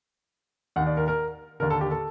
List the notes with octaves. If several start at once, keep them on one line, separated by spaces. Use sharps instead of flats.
D#2 D#3 F#5
D5
A#4
A#4
D#2 D3 A#4
A4
G4
A4